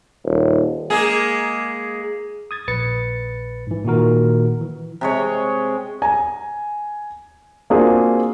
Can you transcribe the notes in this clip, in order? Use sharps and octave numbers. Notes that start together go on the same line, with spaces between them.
D#1
G#3 A#3 G#4
D#6 G#6 A6
A#1 B4 A6 C#7
G#2 E3
A#2 D#3 E4 F#4 A#4
E3
C3 G#3 C#5
G#5 A#5
A#3 C4 D4 F4 F#4 G#4